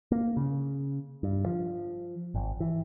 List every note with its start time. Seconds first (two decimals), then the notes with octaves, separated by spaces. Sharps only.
0.12 A#3
0.37 C#3
1.23 G2
1.46 F3
2.34 G#1
2.60 E3